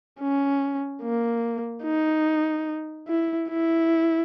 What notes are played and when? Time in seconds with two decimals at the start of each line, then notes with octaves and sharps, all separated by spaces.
0.20 C#4
1.03 A#3
1.84 D#4
3.08 E4
3.49 E4